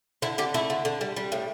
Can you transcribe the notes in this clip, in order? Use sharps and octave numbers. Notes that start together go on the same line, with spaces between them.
D3 E4
D3 G4
A3 E4
D3
D3
G3
G3
A2